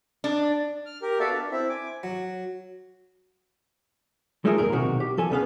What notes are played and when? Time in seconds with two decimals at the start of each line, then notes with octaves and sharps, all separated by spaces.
0.24 D4
0.86 F6
1.02 G4 A#4
1.20 B3 F#4 A4 D5 E5 F5
1.32 D4
1.51 C4 E4 E5
1.69 G#5 D6
2.03 F#3
4.45 G#3 A3 D#4 F4 G#4 A#4
4.58 D#2 A#2 G#4 A#4
4.72 B1 C3 D#3 F#4
5.00 G4
5.17 F3 A4 G#5
5.30 D2 C#3 B3 F5